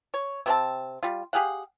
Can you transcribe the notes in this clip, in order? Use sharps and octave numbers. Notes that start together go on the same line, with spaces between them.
C#5
C3 C4 C#4 A5
G3 F4
G4 G#4 F5 F#5